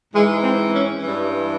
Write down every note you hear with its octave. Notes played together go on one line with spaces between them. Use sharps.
G#2 E3 G#3
C4
C#4
G2 E3